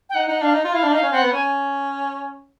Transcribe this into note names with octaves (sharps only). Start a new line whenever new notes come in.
G5
D#4 F#5
D#4 F#5
D4 F5
D#4
F4
E4 F5
D4
D#4 F5
C#4
C4 F#5
B3
C#4 G#5